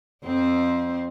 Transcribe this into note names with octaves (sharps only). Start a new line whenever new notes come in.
F2 C4 C5